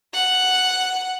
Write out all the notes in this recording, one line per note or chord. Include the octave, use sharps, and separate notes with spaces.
F#5